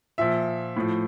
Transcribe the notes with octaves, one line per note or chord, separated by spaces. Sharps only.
A#2 F3 E5
A2 F3